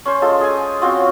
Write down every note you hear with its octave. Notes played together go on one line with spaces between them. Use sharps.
C#4 C5
G#3 F4 A4
G#4 G#5
C4 C#4 F4 F#4